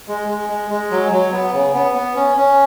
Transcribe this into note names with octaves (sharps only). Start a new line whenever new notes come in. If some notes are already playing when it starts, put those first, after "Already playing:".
G#3
G#3
G#3
G#3
F#3
F#3
B3
C#3
B3
B3
C#4
C#4